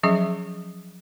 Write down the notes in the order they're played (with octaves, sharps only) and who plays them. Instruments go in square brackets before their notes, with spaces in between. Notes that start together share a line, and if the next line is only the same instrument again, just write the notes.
[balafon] F3 F#3 C#4 G#4 E5